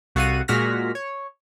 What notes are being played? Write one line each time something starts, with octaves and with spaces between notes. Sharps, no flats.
C2 F#4 A4 F5 F#5 D#7
A#2 G#3 F#4 F6 A#6 B6
C#5